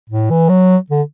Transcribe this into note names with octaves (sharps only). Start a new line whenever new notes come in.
A2
E3
F#3
D3